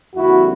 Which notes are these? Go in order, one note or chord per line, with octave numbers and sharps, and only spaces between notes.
F2 D3 G3 A#3 E4 F#4